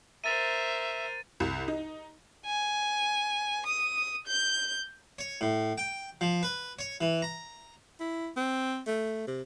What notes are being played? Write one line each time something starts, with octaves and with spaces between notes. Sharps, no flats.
A#4 C5 E5 A6 D#7
C2
D#4
G#5
D#6
G6
C#5
A2
G5
F3
B4
C#5
E3
A#5
E4
C4
A3
C3